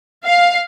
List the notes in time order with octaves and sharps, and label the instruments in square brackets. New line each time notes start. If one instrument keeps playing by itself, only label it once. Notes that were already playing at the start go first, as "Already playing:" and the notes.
[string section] F5